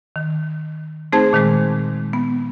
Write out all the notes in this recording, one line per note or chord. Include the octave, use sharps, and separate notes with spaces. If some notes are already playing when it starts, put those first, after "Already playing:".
D#3
A3 C4 D#4 G#4 C5 A5
A#2 D#3 G#3
B3